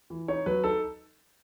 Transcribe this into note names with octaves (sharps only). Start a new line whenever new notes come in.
E3
D#4 C#5
F#3 B4
D#4 A4